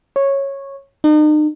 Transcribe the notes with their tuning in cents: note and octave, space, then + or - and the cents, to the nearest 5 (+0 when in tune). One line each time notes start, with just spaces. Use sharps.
C#5 -10
D#4 -40